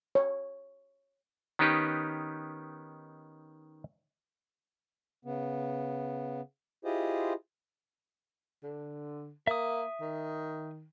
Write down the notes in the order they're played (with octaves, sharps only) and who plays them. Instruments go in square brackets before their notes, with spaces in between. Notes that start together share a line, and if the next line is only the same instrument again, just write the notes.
[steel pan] C#5
[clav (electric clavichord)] D#3 B3 C#4 D#4 G4 B4
[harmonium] C#3 B3
E4 F4 G4 G#4 C5 D#5
[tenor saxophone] D3
[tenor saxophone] A#3 [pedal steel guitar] E5 D#6
[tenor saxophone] D#3